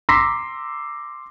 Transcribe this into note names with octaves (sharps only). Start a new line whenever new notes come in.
A#5 C6 D6 E6 A#6 B6